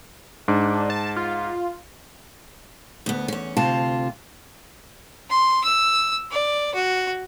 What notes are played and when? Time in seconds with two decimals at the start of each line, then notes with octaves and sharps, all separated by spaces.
0.48 G#2 D4
0.90 A5
1.16 F4
3.06 D2 B3
3.28 E2 C#4
3.57 D2 C3 F4 A5
5.30 C6
5.64 E6
6.31 D5
6.74 F#4